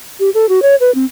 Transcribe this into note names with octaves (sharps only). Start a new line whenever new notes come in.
G4
A4
F#4
C#5
B4
C4